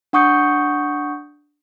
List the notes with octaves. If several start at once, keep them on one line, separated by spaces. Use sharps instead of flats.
D4 F#5 C#6 D#6 G6 C#7